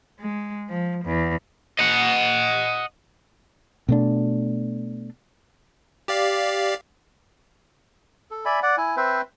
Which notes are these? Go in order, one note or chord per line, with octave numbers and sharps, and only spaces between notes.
G#3
F3
E2
D#5 F#5
B2 A3 D4
G4 D5 F5
A4
D5 E5 G#5 B5
D5 F#5
E4 G#5
C4 B4 C5 E5